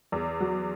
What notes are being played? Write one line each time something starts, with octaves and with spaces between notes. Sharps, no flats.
E2
F#3